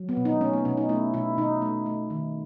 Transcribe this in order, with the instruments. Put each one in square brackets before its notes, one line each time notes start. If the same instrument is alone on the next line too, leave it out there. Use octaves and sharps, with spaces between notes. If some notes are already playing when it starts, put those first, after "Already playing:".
Already playing: [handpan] F#3
B3
B2
D#4
A3 C#4
B3
B2 C#4
D#4
A3 E4
B2 E4
B2 D#4
A3
A3
D#3